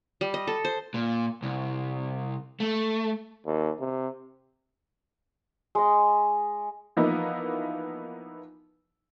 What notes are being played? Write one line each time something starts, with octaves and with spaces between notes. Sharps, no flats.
G3
D#5
A4
C5
A#2
C2
A3
D#2
C3
G#3 D#5
E3 F3 A#3 B3 D#4 E4